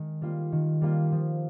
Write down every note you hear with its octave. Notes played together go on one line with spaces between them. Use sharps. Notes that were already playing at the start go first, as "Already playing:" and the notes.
Already playing: D#3 G#3 D#4
G3 A#3 F4
D#3
G3 A#3 F4
F3